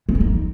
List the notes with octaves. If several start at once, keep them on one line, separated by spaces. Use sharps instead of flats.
E3
E4
D#4